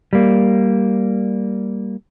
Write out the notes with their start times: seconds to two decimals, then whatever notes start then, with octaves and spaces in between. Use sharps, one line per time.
0.13 G3 A#3